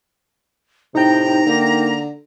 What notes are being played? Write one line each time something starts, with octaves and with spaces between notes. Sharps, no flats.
A2 C3 D#4 G5 A#5
D3 A#3